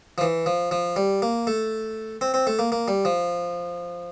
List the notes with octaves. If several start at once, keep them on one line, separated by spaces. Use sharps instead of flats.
F3
E3
F3
F3
G3
A#3
A3
C4
C4
A3
A#3
A#3
G3
F3